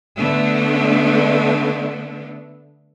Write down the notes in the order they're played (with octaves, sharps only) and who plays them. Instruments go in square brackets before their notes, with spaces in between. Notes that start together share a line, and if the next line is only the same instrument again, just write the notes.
[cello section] D3 A3 B3 D4